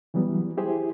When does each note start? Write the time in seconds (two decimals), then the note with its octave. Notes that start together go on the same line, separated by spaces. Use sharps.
0.14 E3 F#3 G3 B3
0.57 E4 G4 G#4 C5